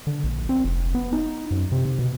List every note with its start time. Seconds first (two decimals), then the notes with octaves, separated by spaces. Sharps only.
0.07 D3
0.24 A#1
0.49 C4
0.64 F1
0.95 B3
1.13 D#4
1.51 F#2
1.72 C3
1.85 C3
1.99 B2